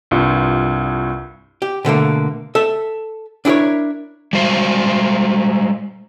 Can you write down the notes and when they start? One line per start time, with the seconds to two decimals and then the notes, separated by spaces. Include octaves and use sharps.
0.11 C2 G2 F4
1.62 G4
1.85 B2 D3 A3 A#3
2.55 A4 E5
3.45 D4 E4 G#4 A#4 C#5
4.33 G3 G#3 F#4 C5